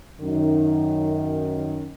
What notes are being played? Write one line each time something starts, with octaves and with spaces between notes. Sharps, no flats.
F#2 D#3 C#4